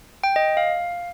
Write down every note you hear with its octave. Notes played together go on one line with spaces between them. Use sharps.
G5
D#5
F5